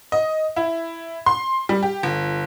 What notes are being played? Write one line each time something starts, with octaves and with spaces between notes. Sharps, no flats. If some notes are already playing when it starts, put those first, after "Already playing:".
D#5
E4
C6
G3
G4
G1